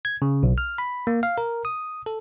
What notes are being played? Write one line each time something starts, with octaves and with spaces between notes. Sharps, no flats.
G#6
C#3
B1
F6
B5
A#3
F5
A#4
D#6
A4